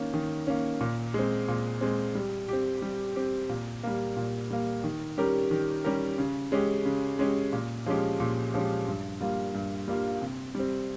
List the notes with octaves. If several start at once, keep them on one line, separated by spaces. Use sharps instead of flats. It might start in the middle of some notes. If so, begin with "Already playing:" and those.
Already playing: D#3 A#3 C#4
D#3
A#3 C#4
A#2
G#3 C4
A#2
G#3 C4
G3
C4 G4
G3
C4 G4
A#2
G3 A#3
A#2
G3 A#3
D#3
G3 C#4 G4 A#4
D#3
G3 C#4 G4 A#4
C#3
G#3 C#4 G4
C#3
G#3 C#4 G4
A#2
F3 G#3 C#4 G4
A#2
F3 G#3 C#4 G4
G2
G3 A#3 F4
G2
G3 A#3 F4
C3
G3 C4